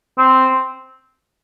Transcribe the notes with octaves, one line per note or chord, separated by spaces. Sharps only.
C4